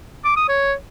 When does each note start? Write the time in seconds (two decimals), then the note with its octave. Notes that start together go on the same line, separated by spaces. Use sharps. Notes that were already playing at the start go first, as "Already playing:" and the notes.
0.25 D6
0.37 D#6
0.48 C#5